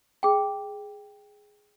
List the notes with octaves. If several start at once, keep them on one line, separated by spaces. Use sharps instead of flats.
G#4 G5